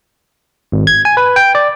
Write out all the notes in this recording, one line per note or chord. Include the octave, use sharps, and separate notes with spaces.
G#1
G#6
G#5
B4
G5
D5